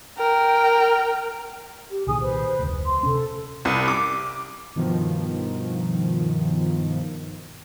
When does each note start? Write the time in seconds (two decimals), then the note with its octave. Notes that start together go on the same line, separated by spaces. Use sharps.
0.18 A#4 G5
1.90 G4
2.07 C2 A#2 D#3 G#4 G#5 D#6
2.20 B4 C5
2.59 F1 D2
2.87 C6
3.03 C3 C#4 A4
3.65 C2
3.88 D6
4.75 G2 B2 D#3 F3